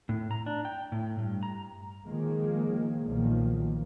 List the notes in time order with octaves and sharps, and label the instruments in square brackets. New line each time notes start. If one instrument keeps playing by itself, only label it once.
[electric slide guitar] A2
A#5
D4
G5
A2
G2
A#5
[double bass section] D#3 F3 G#3 A#3
B1 A#2 D#3 F3 A#3